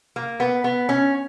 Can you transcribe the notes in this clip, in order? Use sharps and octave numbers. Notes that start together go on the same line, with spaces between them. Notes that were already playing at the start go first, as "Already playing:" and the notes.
A#3
B3
B3
C#4